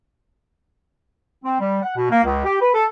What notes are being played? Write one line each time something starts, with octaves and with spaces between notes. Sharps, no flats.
C4
G3
F#5
B2
A#3
C#2
G4
B4
A4